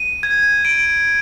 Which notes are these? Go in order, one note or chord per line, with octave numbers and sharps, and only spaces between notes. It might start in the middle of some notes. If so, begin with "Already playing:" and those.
Already playing: D#7
G#6
D7